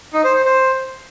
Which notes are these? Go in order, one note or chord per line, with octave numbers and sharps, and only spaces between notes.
D#4
C5
C5
C5